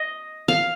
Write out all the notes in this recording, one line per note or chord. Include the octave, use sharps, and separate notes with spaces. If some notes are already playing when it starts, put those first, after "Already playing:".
Already playing: D#5
F5